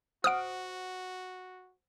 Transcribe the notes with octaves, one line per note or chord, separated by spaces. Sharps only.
F#4 C5 F#5 D#6 F6 D7